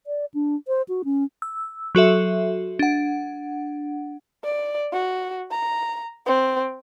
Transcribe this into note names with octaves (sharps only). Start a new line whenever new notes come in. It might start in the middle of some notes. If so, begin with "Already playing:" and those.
D5
D4
C5
F#4
C#4
E6
F#3 F#4 A4 E5
D4 F#5
D5
F#4
A#5
C4